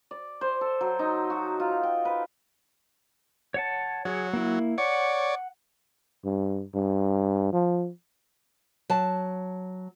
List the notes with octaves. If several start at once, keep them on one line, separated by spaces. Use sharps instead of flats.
D5
C5
A4
F#3
D#4
F#4
F4
G5
B4
C#5 F#5 A5
F#3 G#4 C#5
A#3 E4
C#5 D5 F#5
G2
G2
F3
F#3 A5